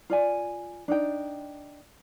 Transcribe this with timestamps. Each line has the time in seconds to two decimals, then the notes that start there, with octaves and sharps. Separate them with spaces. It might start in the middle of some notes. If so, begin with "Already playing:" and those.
0.10 F4 D5 G#5
0.88 D4 D#4 G5